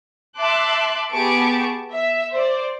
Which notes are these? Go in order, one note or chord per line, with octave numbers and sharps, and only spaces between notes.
E5 A5 C6 D6 F#6
B3 G4 G#4 A5 C#6 D7
E5
C5 D5